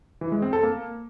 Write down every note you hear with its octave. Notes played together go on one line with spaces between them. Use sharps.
E3
G#3
C4
A4
A#3